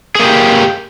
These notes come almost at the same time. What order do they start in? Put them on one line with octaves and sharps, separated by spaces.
G#4 A#3 G4